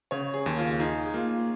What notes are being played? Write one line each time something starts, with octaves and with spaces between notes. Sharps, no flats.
C#3 C#5
G#4
D#2
F4
D#4 G#4
A#3 F4